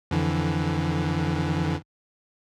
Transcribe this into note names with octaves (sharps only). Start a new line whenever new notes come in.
F2 D3 E3